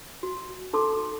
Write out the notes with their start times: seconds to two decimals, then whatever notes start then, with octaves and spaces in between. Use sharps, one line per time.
0.23 F#4
0.73 D#4 A4 C6 D6